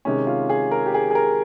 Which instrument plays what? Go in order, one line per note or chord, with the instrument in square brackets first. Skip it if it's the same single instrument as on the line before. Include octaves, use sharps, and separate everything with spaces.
[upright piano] C3 D#3 G#3 C#4
F4
G#4
A#4
G4
G#4
G#4
A#4